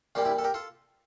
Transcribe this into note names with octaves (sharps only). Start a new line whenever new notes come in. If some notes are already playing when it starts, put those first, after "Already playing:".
A#1 A#2 G3 A#3 D4 F4
E4 G4
A4
G4 A#4
F4 A4